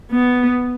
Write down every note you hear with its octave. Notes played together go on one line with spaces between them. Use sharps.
B3